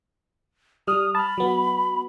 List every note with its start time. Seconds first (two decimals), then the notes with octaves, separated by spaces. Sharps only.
0.87 G3 D#6 F6
1.15 A5 B5 F6
1.38 F#3 B3